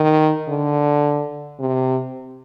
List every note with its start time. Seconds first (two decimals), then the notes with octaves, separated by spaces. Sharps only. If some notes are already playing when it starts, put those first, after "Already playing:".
Already playing: D#3
0.48 D3
1.60 C3